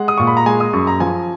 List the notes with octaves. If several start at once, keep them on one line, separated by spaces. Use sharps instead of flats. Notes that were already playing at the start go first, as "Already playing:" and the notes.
Already playing: G#3 F#5
D#6
A#2 C#6
B5
A#5
G#3 G#5
D#6
F#2 C#6
A#5
F3 G#5